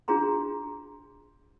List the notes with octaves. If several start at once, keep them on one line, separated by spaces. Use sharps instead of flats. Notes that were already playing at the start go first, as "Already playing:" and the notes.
D4 F4 F#4 G#4 A#5 C6